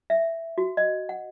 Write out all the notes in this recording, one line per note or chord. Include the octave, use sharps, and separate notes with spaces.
E5
F#4
D#5
F#5